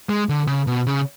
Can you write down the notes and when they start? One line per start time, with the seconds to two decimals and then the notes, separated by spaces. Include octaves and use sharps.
0.09 G#3
0.29 D3
0.47 C#3
0.67 B2
0.87 C#3